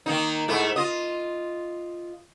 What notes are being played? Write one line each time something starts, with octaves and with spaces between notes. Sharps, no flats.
D#3 A#3 D#4
G#2 A3 E4
F4 D#5